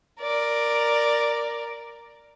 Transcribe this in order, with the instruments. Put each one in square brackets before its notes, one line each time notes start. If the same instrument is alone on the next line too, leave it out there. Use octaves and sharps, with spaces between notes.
[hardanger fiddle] A#4 D5